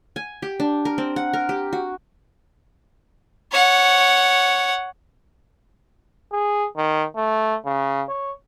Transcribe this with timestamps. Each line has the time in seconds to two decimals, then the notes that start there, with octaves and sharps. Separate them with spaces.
0.16 G#5
0.42 G4
0.60 D4
0.85 A#4
0.98 C4
1.16 F#5
1.33 A#4
1.49 G4
1.73 F#4
3.52 C#5 F#5
6.32 G#4
6.77 D#3
7.16 A3
7.65 C#3
8.09 C#5